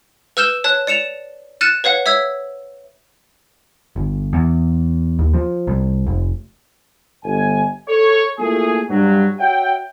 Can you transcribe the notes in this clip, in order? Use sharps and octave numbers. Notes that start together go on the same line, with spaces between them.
B4 E6 F6 G6 E7 G7
C#5 A5 F#6
D5 C#7 E7 F7
F6 F#6 A6 C#7 D#7 E7
B4 C#5 F5 F#5
C#5 E5 E6 G#6
G1
E2
D#2
F3
C2
F1
G1 G#5
A4 C#5
A3 A#3 E4 F4 G#4
G2 F#3
F#4 C#5 E5 F#5 G5